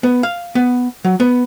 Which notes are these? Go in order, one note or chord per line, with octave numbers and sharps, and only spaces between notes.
B3
F5
B3
F#3
B3